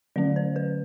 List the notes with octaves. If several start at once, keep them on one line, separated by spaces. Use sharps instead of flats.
D3 F#3 A3 C#4 D5
C5
B4